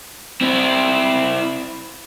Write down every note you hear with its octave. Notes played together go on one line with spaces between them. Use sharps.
C4 E4